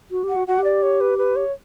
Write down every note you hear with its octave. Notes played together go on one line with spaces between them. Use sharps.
F#4
G4
F#5
F#4
F#4 F#5
G4
D5
C#5
B4
B4
C#5